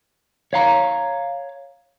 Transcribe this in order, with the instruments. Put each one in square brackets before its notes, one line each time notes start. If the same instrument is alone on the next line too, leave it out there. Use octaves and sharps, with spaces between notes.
[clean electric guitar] C#5 F5 A#5